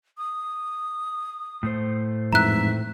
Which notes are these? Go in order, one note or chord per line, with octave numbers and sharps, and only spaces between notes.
D#6
A2 A3 C5
F2 G#2 E3 E5 A#5 F#6